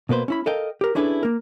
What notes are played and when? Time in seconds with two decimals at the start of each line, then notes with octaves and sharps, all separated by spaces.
0.09 B2 A#3 B4 C5
0.28 C#4 E4 B5
0.46 A4 A#4 D#5 F5 G5
0.81 G4 A#4
0.95 C#4 D4 E4 G#4 A4 B4
1.23 A#3 A#4